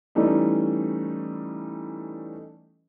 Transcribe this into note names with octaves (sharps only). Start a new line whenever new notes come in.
E3 G3 A3 C#4 D#4